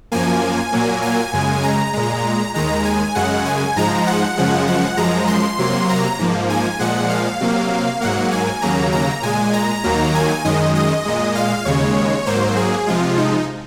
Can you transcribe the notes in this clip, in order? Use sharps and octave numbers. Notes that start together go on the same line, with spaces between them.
F#2 F3 A#3 G#5
A#2 F#3 A#3
G#5
F#2 C#3 G#3
A#5
A#2 G#3
D#2 D#3 G#3 A#5
G#5
F#2 C#3 G#3 F#5
G#5
G#2 F3 G#3 A#5
F#5
F#2 C#3 F3 G#3
F#5
F#2 F3 G#3 A#5
C6
C3 F#3 A#3
A#5
G#2 F3 A#3
G#5
A#2 F3 G#3 F#5
F5
C3 F#3 A#3
G#2 F#3 A#3 F#5
G#5
D#2 C#3 F#3 A#3 A#5
A#5
A#2 G#3 G#5
A#5
D#2 D#3 F#3 A#3
G#5
F#2 D#3 G#3 D#5
D#5
A#2 G#3
F5
D#2 C#3 G#3 C#5
G#2 F#3 A#3 C5
G#4
C3 F3 G#3 F4
D#4